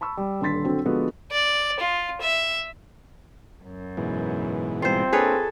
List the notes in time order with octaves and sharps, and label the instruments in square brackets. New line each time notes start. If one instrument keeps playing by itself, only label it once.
[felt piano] A5 B5 C#6 E6
G3
D#1 G2 D3 C6 A6 B6
D3 F#3 C4
D3 F3 G#3 B3 F#4 A4
[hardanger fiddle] D5
F4
E5
[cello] F#2
[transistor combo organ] G#2 B2 E3
[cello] C3 G3 [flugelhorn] C4 [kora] F4 C5
[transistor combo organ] A#3 D4 [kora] G#4 B4 C#5 [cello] A4